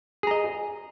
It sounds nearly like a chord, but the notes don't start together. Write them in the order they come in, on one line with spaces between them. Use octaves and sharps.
G#4 A#5 D#5